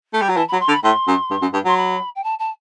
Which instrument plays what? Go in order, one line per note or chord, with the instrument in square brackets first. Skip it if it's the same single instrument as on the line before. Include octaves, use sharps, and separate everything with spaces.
[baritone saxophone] A3
G3
F#3
[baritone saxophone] E3 [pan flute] A5
[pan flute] B5
[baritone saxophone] F#3
[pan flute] C6
[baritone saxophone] D3
[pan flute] B5
[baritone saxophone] A2 [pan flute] C6
[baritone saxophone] F#2
G2
F#2
G2
[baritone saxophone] F#3 [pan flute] C6
[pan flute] B5
G5
A5
A5